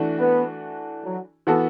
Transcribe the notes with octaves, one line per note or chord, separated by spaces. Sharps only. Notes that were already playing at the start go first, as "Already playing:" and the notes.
Already playing: E3 A3 D4 F#4
B3
F#3
E3 B3 F#4 A4